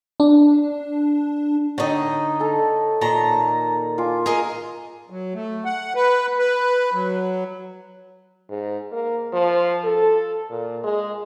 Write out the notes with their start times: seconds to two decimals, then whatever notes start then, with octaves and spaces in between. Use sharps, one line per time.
0.20 D4
1.78 D3 D#4 C#5 D#5 G5
2.40 A4 A#5
3.01 A#2 D#3 A5 A#5
3.98 F4 G#5 D6
4.26 G#4 A#4 D#5
5.10 F#3
5.34 A3
5.65 F#5
5.95 B4
6.39 B4
6.93 F#3
8.50 G#2
8.92 A#3
9.33 F3
9.84 A4
10.50 A#2
10.84 G#3